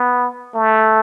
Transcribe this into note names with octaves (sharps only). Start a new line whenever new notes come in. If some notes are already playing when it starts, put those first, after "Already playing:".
Already playing: B3
A3